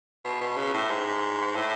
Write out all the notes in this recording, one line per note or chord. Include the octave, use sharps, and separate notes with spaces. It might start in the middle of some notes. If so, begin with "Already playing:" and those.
B2
B2
C#3
A2
G#2
A2